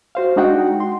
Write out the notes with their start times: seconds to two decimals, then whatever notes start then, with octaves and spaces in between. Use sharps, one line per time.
0.15 F#4 C5 F5
0.36 G#3 D4 D#4 F#4 F#5 G5
0.80 C6